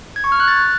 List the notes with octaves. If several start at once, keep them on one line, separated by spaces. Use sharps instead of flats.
G#6
C#6
F6
F#6
A6